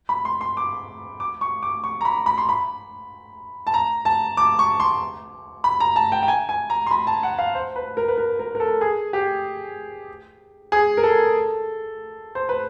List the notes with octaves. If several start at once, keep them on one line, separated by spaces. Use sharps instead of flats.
B5
C6
C6
D6
D6
C#6
D6
C#6
A#5
B5
B5
C6
B5
A5
A#5
A5
D6
C#6
C6
B5
A#5
A5
G5
G5
G#5
G#5
A#5
C6
B5
A5
F#5
F5
C5
B4
A#4
B4
A#4
A#4
A#4
A4
G#4
G4
G#4
A#4
A4
C5
B4